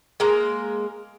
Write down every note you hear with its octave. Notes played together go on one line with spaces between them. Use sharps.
G#3 A#3 A#5